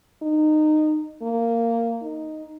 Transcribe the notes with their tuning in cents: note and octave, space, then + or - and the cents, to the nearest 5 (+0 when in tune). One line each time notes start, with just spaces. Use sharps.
D#4 -20
A#3 -15
D#4 +0